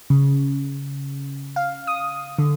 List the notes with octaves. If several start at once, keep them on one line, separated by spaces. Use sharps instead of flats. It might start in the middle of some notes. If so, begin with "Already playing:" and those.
C#3
F5
D#6
D3